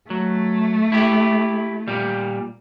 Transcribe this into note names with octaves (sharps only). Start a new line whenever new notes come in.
F#3 A3
E4 G4
A#2 G3